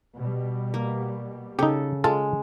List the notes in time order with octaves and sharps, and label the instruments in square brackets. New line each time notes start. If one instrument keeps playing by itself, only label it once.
[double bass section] B2 G3
[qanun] A#3
[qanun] C#3 A4 [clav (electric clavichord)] D#4 G4
[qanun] G#3 [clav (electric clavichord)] F4 A4 A5